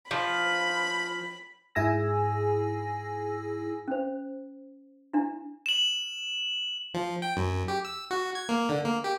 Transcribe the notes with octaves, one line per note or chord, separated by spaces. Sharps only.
F3 B5
G#2 E4 G#4 G#5 E6 A#6
C#4 C5
D4 E4
E7 F#7
F3
G5
F#2
G4
E6
F#4
G#6
A#3
D3
A#3
G4